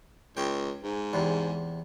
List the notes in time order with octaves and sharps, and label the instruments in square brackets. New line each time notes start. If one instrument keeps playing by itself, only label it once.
[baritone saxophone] C#2 [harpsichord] G5
[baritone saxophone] G#2
[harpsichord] E2 C3